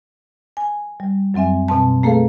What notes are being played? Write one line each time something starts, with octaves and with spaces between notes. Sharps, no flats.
G#5
G3
F#2 F#3 C4 E5 G#5
B2 C4 A5
A3 A#3 G#4 A4 B4 F5